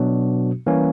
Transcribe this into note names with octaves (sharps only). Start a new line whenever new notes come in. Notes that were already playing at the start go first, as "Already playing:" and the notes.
Already playing: B2 F#3 B3 D4 F#4
E3 G3 A#3 C#4